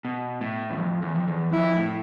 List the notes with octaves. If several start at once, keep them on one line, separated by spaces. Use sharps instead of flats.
B2
A2
E2
F2
E2
F2
E2
F2 E4
A2